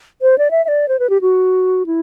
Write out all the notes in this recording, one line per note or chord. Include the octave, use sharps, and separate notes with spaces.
C5
D5
E5
E5
D5
C5
B4
G4
F#4
E4